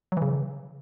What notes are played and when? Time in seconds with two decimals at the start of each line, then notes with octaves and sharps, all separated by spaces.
0.12 F#3
0.17 E3
0.22 C#3